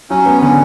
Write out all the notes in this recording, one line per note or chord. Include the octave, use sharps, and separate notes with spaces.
F#3 C#4
B3
D3 C#4